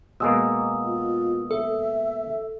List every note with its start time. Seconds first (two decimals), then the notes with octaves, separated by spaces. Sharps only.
0.20 B2 G#3 A#3 D#6 E6
0.84 F4
1.51 A4 E5